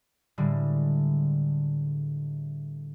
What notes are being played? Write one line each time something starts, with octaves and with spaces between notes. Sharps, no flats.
A2 D3 G3 G#3